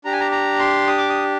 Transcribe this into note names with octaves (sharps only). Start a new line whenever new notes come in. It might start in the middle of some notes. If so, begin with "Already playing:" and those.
D4 G4 A#5
G#5
A#5
A#5
C6
D#6
D6
D#6